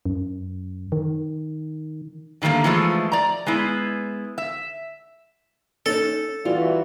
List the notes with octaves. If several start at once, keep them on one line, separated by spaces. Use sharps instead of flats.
F#2
D#3
D3 D#3 G3 A3 A#3
E3 F3 G#3 A3
D5 A#5
G#3 B3 E4
E5
C#4 D#4 A4 C#5
E3 G3 F4 F#4